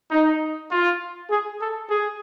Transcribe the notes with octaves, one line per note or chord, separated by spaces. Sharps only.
D#4
F4
G#4
A4
G#4